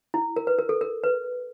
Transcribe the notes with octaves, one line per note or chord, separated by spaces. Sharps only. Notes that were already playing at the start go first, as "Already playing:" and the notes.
E4
A#4
B4
A#4
A4
A#4
B4